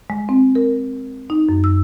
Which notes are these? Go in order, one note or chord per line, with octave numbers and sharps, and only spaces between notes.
G#3
C4
A#4
D#4
F#2
E6